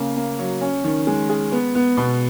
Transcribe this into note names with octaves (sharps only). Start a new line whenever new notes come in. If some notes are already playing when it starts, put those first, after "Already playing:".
Already playing: C#3 A#3
A#3
F#3
C#4
D#3
G#3
G#4
B3
B3
B2